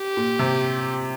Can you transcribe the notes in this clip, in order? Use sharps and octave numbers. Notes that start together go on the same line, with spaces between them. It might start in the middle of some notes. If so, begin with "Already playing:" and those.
Already playing: G4
A#2
C3